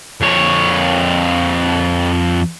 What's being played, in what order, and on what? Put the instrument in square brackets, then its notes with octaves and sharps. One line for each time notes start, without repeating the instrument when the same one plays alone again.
[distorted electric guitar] F2 C#5